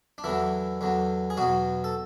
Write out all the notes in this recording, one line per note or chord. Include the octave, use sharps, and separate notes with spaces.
D4
E2 D3 E3 F#3 E4
E2 D3 F#3
G#4
E2 B2 F#3 F#4
A4